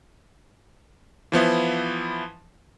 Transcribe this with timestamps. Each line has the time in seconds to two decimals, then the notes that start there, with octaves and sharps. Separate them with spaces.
1.32 E3 F3 B3 E4